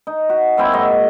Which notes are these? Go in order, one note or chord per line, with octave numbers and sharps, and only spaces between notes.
D#4
F#4
F#3 A#3 C4 E4
G#2 D#5 C#6